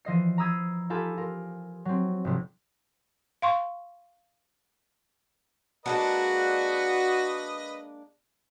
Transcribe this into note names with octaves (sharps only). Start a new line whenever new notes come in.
E3 F3 D#5 C7
A#5 B5 D#6 E6 G#6 C7
F4 G4 A4 G#5 B5
F4 A#4
F#3 C4
F1 C3
F5 C6 C#6
G#3 A#3 D4 F#4 B4 D#5